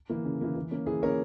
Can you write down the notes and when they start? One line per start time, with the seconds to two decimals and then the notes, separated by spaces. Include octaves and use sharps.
0.10 E3 A#3
0.25 C#3
0.41 E3 A#3
0.56 E3
0.71 A#3 C#4
0.86 E3 G#4
1.03 A#3 C#4 A#4 C#5